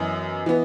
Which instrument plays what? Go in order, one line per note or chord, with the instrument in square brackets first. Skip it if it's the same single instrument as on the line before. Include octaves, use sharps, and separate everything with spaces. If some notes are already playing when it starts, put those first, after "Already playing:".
Already playing: [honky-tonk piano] F#2 E3 B3 D#5
E3 B3